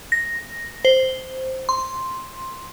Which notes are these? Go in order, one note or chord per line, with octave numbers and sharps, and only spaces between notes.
A#6
C5
C6